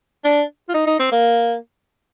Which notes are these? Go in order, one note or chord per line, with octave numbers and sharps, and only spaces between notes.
D4
F4
D#4
D#4
C4
A#3